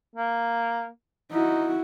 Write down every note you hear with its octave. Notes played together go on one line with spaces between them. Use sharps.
A#3
D#4 E4 F#4